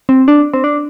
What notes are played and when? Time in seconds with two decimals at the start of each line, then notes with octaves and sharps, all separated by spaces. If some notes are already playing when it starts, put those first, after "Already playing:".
0.09 C4
0.28 D4
0.54 C4
0.64 D4